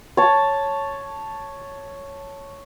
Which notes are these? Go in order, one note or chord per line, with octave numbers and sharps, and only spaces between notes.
C#5 A5